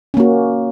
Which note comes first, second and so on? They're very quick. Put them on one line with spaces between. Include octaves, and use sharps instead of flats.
C#4 A#3 F#4